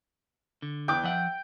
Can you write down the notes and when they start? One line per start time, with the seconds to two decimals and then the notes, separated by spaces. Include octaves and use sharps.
0.62 D3
0.88 E2 G5 D6
1.04 F3 E5 F#5